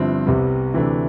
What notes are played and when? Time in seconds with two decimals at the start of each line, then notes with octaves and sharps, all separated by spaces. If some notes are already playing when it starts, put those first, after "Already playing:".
Already playing: G1 G2 F3 C4 E4
0.26 C2 C3 G3 B3
0.73 D2 C3 E3 A3 D4